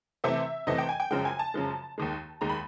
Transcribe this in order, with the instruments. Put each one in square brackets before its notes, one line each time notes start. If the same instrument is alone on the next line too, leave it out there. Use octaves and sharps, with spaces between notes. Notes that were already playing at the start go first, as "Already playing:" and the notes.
[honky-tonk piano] C3 E3 A3 C4 E5
C3 E3 A3 C4 D#5
G5
G#5
G5
F#2 C#3 F3 G#3 G5
G#5
A5
F#2 C#3 F3 G#3
D#2 D#3 G#3
D#2 D#3 G#3 A#5
B5